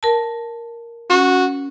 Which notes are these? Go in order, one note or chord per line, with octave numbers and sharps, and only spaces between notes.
A#4 A5
C#4 F#4